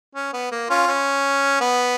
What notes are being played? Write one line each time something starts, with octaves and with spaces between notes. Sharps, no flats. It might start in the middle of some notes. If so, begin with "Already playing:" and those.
C#4
B3
A#3
C#4 F4
C#4
B3